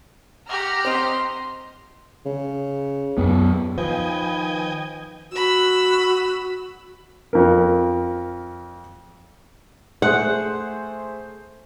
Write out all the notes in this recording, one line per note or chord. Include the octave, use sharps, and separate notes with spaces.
G4 F#5 A#5 F6
C4 D#5 C6
C#3
F#2 B3
D#3 F3 B4 D#5 G5 G#5
F#4 B5 E6
F2 A#4
A3 G#4 C5 F#5